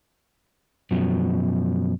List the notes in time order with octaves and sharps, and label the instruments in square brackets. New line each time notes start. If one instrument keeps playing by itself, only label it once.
[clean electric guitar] F#2 B2 F3